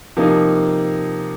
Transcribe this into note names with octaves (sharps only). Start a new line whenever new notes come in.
C3 F3 A#3 D#4